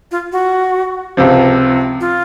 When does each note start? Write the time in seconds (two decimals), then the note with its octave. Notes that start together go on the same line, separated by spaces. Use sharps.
0.11 F4
0.32 F#4
1.17 C#2 C3 F3
2.01 F4